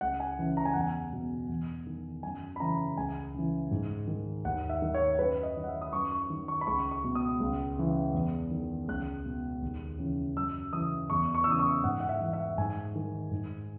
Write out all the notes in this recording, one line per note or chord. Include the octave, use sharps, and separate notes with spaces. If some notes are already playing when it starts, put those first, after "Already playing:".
C#2 F#5
G#5
C#3 E3
A#5
G#5
E2 F#5
G#5
B2
E2
D#3
F#2 G#5
B5
C#3 E3 A#5
C#2 G#5
C#3 E3
G#2
D#3
D#2 F#5
E5
D#3
C#5
F#2 B4
D#5
D#3
F#5
E5
D#6
F#2 C#6
C#6
D#3
C#6
B5
C#2 C#6
C#6
B2
D#6
C#2
C#3 E3
E2
D#3
C#2 F#6
B2
D#2
C#3 E3
F#2 E6
C#3 E3 D#6
E2 C#6
C#6
E6
C#3 E3 D#6
C#6
G#2 F#5
F#5
E5
E3
E5
G#2 G#5
D#3
G#2